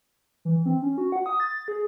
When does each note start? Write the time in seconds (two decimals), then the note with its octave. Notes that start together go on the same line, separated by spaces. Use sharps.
0.45 E3
0.66 C4
0.82 C#4
0.98 F#4
1.12 F#5
1.26 D#6
1.40 A6
1.68 G#4